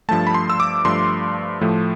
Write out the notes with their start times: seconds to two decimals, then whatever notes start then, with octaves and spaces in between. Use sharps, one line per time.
0.09 G2 F3 A3 A5
0.27 B5
0.34 C6
0.50 E6
0.60 D6
0.85 G2 F3 A3 C6
1.61 A2 F3 A3